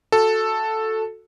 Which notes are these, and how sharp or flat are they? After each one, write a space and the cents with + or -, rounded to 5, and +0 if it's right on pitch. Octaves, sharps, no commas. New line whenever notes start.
F#4 -15 A4 +0